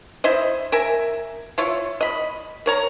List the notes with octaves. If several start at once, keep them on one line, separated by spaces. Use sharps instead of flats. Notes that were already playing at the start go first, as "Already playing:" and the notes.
E4 C5 D#5
A#4 E5 G#5
E4 F4 C#5
D#5 B5
A#4 C#5 A#5